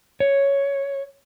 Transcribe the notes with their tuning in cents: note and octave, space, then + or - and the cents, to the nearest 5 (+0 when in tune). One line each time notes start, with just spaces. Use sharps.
C#5 +0